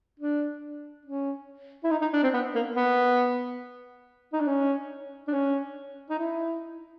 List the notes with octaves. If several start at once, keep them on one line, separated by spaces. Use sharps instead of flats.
D4
C#4
E4
D#4
D#4
D4
C4
B3
A#3
B3
D#4
D4
C#4
D4
C#4
D#4
E4